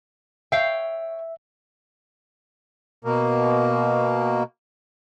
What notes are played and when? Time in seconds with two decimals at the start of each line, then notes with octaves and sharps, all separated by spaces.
0.52 C#5 E5 F5 G5
3.05 B2 A#3